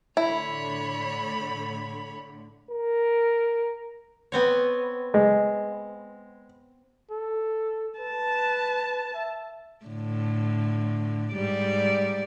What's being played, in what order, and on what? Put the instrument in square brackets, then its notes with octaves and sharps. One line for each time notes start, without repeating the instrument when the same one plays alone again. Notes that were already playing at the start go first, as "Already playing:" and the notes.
[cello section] A2 D3 [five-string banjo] E4 [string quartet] C#5 B5
[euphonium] A#4
[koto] B3 C4 C#5
[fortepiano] G#3
[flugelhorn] A4
[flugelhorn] B4 [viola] A5
[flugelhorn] E5
[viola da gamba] A2 D3
G#2 G3 D5